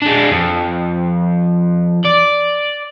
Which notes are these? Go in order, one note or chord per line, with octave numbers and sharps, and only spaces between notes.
G#3 D4
F2
D5